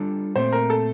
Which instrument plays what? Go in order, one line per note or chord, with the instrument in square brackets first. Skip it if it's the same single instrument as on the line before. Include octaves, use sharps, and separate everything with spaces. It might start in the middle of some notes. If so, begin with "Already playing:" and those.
Already playing: [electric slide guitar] G3 D4 F4 A4
[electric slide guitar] A#2 A3 C4 [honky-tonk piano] C5
[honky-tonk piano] A#4
A4